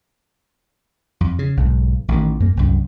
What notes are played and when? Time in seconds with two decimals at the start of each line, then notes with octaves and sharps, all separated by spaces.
1.21 F2
1.39 C#3
1.57 B1 G#2
2.08 A1 D#3
2.40 F#2 A#3
2.57 C2 F#2